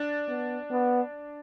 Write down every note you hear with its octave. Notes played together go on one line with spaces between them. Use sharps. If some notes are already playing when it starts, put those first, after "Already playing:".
Already playing: D4
B3
B3